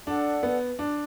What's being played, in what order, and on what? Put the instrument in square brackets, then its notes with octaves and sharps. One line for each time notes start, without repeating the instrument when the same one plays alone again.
[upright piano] D4 [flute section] A4 D5 F#5
[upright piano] B3
D4